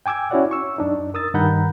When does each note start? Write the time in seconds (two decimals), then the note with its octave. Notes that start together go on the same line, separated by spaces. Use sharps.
0.06 G5 G#5 D6 E6 G#6
0.31 C#4 E4 F#4 C#5 D5 F#5
0.51 C#6 E6
0.78 F#2 D4 D#4
1.14 A#4 D#6 E6 A6
1.34 G2 D#3 F#5 A#5 B5 G6